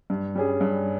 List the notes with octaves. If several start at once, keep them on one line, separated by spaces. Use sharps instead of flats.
G2
G3 C#4 G#4
G2